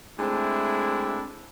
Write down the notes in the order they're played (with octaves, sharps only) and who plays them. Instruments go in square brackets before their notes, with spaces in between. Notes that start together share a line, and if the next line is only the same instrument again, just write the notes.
[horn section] G#3 A3 C4 D4 E4